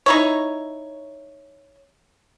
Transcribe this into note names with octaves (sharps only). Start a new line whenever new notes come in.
D#4 E4 C#5